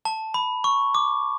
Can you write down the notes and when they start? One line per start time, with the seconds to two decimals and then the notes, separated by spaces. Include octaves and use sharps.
0.05 A5
0.34 B5
0.64 C#6
0.95 D6